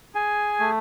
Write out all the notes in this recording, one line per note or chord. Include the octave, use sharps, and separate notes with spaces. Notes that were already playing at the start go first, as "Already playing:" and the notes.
G#4 G#5
A3